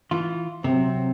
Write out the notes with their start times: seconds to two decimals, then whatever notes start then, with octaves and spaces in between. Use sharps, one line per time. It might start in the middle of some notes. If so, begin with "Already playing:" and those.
0.11 E3 F4
0.64 C3 F#3 C4